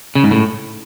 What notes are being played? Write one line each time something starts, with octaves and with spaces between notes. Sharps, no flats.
C#3
G#2
A2